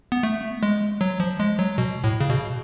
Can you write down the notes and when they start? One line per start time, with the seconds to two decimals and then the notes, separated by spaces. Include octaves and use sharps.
0.12 B3
0.23 A3
0.63 G#3
1.01 F#3
1.20 F3
1.40 G#3
1.59 F#3
1.78 B2
2.04 A2
2.21 C#3
2.30 B2